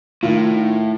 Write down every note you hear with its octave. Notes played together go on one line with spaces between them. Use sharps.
A2 D#3 F4